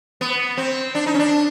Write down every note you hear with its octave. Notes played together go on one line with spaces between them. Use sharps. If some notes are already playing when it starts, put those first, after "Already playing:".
B3
C4
D4
D#4
C#4
D4